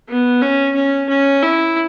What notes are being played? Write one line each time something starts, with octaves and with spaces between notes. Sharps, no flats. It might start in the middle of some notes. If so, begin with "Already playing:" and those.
B3
C#4
C#4
C#4
E4